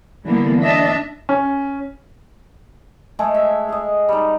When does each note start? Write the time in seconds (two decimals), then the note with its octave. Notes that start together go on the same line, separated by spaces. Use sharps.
0.24 D3 E3 G3 A#3 B3
0.60 D4 D#5 E5
1.29 C#4
3.19 G#3 A3 G#4 A4
3.34 E5
3.69 G#4 D#5
4.09 G3 D#4